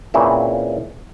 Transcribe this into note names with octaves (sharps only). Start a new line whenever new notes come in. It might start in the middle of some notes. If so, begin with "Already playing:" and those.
A#2 C#3 E3 C4 E4